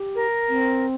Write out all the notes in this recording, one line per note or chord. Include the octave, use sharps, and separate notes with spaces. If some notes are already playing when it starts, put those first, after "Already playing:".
Already playing: G4
A#4
C4